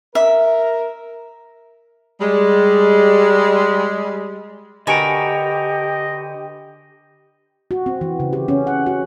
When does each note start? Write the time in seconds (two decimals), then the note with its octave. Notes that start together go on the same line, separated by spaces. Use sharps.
0.15 A#4 E5
2.20 G3 G#3
4.87 D3 F#4 G4 A#4 B4 D#5 G#5
7.71 F#4
7.86 C4
8.01 E3
8.20 C#3
8.33 G4
8.48 C#4
8.67 F#5
8.86 F#4